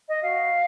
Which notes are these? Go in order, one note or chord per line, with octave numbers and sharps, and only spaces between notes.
D#5
F#4 F5